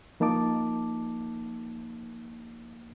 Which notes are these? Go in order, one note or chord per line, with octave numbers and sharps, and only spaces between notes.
F3 A#3 D#4 A5 D6